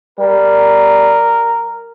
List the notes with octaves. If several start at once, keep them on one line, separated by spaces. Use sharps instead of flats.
G3 A#4